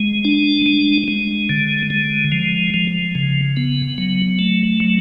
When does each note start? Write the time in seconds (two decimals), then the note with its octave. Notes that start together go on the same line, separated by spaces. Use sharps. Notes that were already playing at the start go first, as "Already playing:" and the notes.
Already playing: G#3
0.25 D4
0.66 G#3
1.08 G#3
1.49 D3
1.90 G#3
2.32 F3
2.74 F3
3.15 C#3
3.57 B3
3.98 F#3
4.39 A3
4.80 F#3